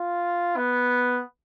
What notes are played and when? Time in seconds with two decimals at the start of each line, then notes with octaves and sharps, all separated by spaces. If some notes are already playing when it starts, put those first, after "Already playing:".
Already playing: F4
0.56 B3